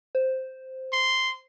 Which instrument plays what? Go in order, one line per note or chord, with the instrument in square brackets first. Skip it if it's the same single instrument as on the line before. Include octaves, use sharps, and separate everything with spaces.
[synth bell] C5
[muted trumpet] C6